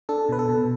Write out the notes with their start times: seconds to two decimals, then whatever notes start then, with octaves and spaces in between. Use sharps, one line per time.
0.09 D4 A4
0.29 B2 B4
0.39 A4
0.49 B2